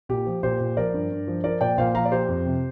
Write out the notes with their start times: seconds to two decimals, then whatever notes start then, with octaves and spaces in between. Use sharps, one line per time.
0.09 A#2 G4
0.26 F3
0.43 A#2 G4 C5
0.60 A#2
0.77 F3 A#4 D5
0.93 G2
1.11 G2
1.27 F3
1.44 F3 A#4 D5
1.61 A#2 D5 G5
1.78 A#2 C5 F5
1.94 F3 F5 A#5
2.05 D5
2.11 F3 G4 C5
2.28 F2
2.46 C3